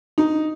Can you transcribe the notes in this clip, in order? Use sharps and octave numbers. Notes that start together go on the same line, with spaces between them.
D#4